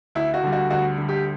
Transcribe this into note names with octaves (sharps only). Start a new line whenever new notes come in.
D2 E4
F#4
D3 G3
F#4
D2 F#4
D3 G3
G4